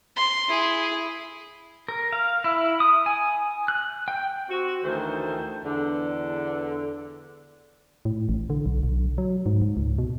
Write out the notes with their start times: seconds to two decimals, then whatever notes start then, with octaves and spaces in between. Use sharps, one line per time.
0.16 C6
0.48 E4 G#4
1.88 A#4
2.12 F5
2.44 E4
2.80 D#6
3.06 G#5
3.68 F#6
4.08 G5
4.50 C4 F#4
4.84 D2 D#3 E3 A3 A4 C5
5.64 E2 D3 D4
8.05 A2
8.29 A1
8.50 D3
8.66 B1
8.83 B1
9.18 F#3
9.46 G#2
9.62 G#2
9.77 C#2
9.98 B2